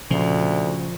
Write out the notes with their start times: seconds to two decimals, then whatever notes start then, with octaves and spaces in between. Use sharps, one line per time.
0.11 D2 A#2 C#3 F3